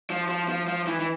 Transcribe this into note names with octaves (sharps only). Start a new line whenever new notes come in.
F3
F3
F3
F3
E3
E3